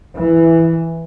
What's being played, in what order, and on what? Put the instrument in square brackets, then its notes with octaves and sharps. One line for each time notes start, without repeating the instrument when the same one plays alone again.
[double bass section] E3